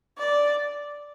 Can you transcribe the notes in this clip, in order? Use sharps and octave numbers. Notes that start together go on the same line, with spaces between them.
D5